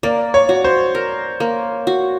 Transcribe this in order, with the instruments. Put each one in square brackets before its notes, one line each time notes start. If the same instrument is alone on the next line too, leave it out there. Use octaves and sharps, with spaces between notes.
[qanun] A#3 [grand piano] D5
[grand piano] C#5
[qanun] F#4
[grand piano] C5
[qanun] A#4
A#3
F#4